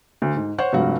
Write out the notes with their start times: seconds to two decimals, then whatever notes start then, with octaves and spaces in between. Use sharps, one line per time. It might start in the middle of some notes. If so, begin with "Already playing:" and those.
0.22 D2
0.36 G#2
0.58 C5 C#5 F#5 C#6
0.73 F1 G2 F3 G#3 F#4 F#5